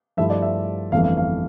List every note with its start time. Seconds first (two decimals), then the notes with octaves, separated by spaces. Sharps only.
0.17 G2 F3 A3 E4 E5
0.30 D5
0.42 E5
0.92 G1 F2 E3 A3 F5
1.04 F5
1.17 F5